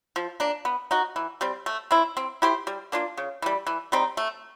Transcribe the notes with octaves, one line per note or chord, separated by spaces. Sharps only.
F3
A#3 D4
B3
D#4 F#4
E3
G3 C4
A3
C4 E4
C4
E4 G4 C5
G3
A#3 D4 F4
C#3
E3 G3
E3
G3 C4 D#4
A3